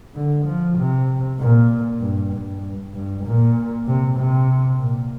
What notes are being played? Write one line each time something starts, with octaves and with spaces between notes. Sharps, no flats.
D3
F3
C3
A#2
G2
G2
G2
A#2
C3
C3
A#2